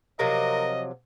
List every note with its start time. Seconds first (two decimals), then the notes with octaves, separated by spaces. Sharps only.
0.19 C3 F3 F#3 A#4 D#5